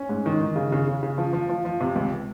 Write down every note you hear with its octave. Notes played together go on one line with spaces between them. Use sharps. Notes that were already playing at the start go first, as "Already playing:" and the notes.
Already playing: C#4
G#2
D#3
D#3
C#3
C#3
C#3
C#3
F3
F3
F3
F3
C3
C#2